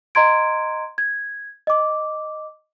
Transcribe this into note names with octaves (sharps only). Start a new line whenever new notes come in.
D#5 A#5 C6 G#6 D7
G#6
D#5 D6